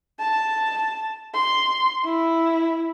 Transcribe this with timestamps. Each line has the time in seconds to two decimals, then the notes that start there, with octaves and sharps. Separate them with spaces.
0.20 A5
1.34 C6
2.05 E4